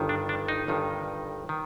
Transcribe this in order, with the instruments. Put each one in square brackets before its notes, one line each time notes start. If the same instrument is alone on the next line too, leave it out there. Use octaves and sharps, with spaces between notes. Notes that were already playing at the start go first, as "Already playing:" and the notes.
Already playing: [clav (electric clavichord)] G1 G2 D#3
D4
D4
D#4
G1 G2 D#3
D#3